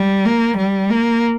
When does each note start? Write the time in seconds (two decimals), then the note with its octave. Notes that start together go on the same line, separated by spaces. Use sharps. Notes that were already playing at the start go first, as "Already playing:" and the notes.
Already playing: G3
0.25 A#3
0.57 G3
0.89 A#3